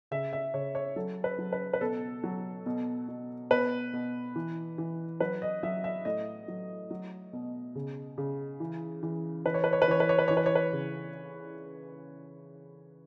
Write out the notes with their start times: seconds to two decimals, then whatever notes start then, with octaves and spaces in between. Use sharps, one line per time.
0.11 C#3 E5
0.33 E5
0.54 C#3 C#5
0.75 C#5
0.96 F#3 A4
1.24 B4
1.38 F#3
1.52 B4
1.73 B4
1.81 B2 A4
2.24 F#3
2.66 B2
3.08 B2
3.51 B2 B4
3.93 B2
4.36 E3
4.78 E3
5.20 F#3 B4
5.42 D#5
5.63 F#3 E5
5.84 E5
6.05 A2 D#5
6.48 F#3
6.91 F#3
7.33 B2
7.75 C#3
8.18 C#3
8.60 E3
9.03 E3
9.45 E3 B4
9.54 C#5
9.64 B4
9.73 C#5
9.82 B4
9.88 E3 C#5
10.00 B4
10.09 C#5
10.18 B4
10.28 E3 C#5
10.37 B4
10.46 C#5
10.55 B4
10.73 C#3